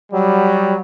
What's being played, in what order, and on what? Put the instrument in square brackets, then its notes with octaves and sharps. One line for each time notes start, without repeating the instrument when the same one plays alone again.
[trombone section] F#3 G3